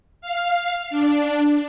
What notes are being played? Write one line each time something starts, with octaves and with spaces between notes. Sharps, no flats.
F5
D4